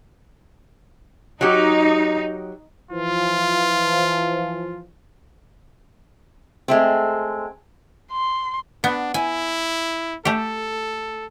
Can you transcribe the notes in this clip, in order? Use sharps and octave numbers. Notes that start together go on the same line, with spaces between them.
F#3 D#4 G4
E3 F3 F4
G#3 A3 C4
C6
B3 D4
E4 G#5
A3 G4 A4